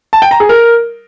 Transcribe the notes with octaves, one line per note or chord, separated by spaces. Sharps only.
A5
G5
A#5
G#4
A#4